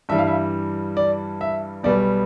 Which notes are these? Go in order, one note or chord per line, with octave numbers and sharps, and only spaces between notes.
G2 E3 G3 E5
F5
E5
D5
E5
B1 B2 G3 B3 D5